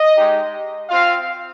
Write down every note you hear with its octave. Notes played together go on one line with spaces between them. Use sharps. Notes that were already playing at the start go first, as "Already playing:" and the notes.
Already playing: D#5
G#3 D#4 G4
C4 F4 F5